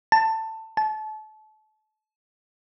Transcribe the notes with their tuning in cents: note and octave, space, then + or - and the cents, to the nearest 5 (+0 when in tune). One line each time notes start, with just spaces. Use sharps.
A5 +15
A5 -30